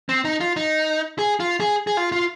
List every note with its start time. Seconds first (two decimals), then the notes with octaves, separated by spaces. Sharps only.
0.09 C4
0.25 D#4
0.40 F4
0.56 D#4
1.19 G#4
1.40 F4
1.60 G#4
1.87 G#4
1.97 F4
2.12 F4